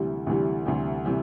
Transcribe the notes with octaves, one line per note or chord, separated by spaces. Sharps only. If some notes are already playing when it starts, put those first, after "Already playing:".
Already playing: D2 C3 E3 G3
D2 C3 E3 G3
D2 C3 E3 G3
C3 E3 G3